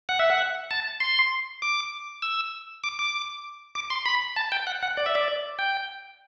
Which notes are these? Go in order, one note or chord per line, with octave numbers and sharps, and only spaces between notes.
F#5
E5
F#5
A5
C6
D6
E6
D6
D6
D6
C6
B5
A5
G5
F#5
F#5
D5
E5
D5
G5